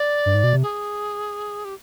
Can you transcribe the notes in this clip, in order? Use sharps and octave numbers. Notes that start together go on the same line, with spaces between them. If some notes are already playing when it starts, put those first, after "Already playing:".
Already playing: D5
G2
G#2
B2
C3
G#4
G4